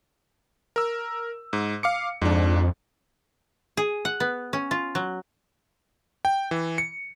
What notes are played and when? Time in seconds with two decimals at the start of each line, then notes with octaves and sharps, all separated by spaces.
0.76 A#4 E6
1.53 G#2
1.83 F5 D6 C#7
2.22 F2 G#2 D4
3.77 G#4
4.05 F#5
4.20 B3
4.53 C#4
4.71 F4
4.95 F#3
6.25 G5
6.51 E3
6.78 C#7